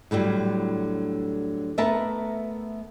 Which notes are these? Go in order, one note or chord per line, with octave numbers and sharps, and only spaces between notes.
A2 D3 F#3 G3
A3 B3 A#4 E5 A5